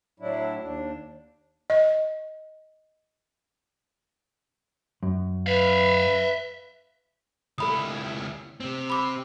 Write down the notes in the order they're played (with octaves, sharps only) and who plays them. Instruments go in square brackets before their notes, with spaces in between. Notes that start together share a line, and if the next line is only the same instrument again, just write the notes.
[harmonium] A2 F#3 D4 E4
D#2 D4
[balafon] D#5
[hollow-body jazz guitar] F#2
[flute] B4 [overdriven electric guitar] E5 F5
[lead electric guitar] C#2 E4 [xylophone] A4 B5 D#6
[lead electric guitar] C3 C4
[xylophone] B5 D6